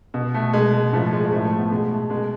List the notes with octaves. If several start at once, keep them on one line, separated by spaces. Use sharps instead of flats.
B2
A3
B2 G#3
G#3
A2 F3 A3
A3
G#3
G#3
A2 F3 A3
A3
B3
B2 G#3
A3
B2 G#3